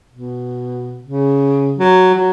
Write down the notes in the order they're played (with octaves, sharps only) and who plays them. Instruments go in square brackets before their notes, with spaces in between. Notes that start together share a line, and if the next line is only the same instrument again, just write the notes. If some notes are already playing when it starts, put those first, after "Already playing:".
[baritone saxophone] B2
C#3
F#3
F#3